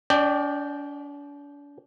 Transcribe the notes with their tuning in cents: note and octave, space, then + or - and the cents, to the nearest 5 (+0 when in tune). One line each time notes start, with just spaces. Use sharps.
D4 -45 D5 +25 G5 +0